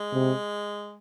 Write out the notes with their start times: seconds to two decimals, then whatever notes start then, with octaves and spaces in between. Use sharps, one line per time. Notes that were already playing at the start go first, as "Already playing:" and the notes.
Already playing: G#3
0.13 C3